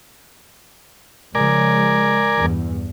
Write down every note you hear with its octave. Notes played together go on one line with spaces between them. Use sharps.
C#3 F3 G#3 A#4 D5 G#5
E2 G2